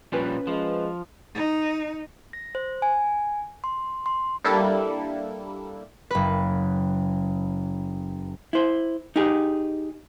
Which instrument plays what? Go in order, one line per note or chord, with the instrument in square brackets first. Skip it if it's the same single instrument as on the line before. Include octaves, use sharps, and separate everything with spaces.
[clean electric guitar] A#2 F3 G3 [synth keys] C#4 B4
[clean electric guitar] F3 [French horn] G#3
[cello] D#4
[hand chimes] A#6
C5
G#5
C6
C6
[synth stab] G3 A#3 D4 E4 A4
[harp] F#1 B4
[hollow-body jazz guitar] E4 C5
D#4 G4 G#4